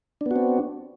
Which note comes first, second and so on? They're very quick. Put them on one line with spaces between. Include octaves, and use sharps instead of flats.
D4 B3 F#4 C4